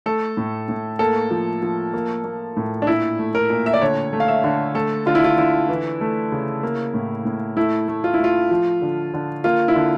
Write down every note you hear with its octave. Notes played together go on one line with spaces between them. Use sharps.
A3 A4
A2
A2
A#3 A4
F3
F3
A#3
A#3
A2
D4
A#2 E4
A3
A#4
A#2
E5
D5
D3 C#5
A3
F5
E5
D3
A3 A4
D3 F4
E4
F4
D3 E4
E3
A3
C#3
A#3
A2
A2
A3 E4
A3
F4
E4
A3 F4
F3
D3
D3
A#3 F4
E4
D3